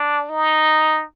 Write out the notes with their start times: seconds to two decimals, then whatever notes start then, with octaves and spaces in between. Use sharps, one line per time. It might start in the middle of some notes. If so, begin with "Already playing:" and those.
Already playing: D4
0.29 D#4